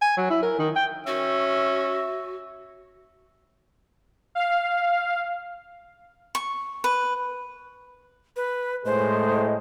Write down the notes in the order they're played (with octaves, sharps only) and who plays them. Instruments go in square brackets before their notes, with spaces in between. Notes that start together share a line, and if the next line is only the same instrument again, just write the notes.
[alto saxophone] G#5
F#3
E4
A#4
D#3
G5
[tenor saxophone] C#4 [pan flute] F#4 [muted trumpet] E5
[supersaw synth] F5
[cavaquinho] C#6
B4
[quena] B4
[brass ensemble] A2 G#3 [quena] C5